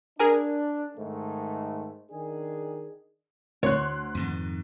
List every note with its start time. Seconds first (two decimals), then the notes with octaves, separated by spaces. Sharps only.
0.20 D4 G#4 A#4 G#5
0.97 G#2 D#3 A3
2.11 D#3 D4 G#4
3.63 D2 C#5 C6 F#6
4.15 F2 G#2 D#3